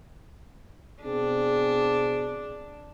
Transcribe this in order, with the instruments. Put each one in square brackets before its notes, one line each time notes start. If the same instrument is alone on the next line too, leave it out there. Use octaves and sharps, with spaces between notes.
[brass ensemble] B2 C4 G#4 [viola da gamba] D4